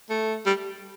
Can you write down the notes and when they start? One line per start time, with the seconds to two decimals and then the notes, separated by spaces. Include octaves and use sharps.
0.10 A3
0.46 G3